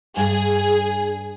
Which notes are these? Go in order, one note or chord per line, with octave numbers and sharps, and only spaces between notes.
G2 G#4